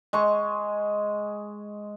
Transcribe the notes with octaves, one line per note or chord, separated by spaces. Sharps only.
G#3 C#6